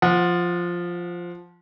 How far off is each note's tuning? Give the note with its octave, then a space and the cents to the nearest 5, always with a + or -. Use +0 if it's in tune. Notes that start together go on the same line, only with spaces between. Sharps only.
F3 +0 F#5 -30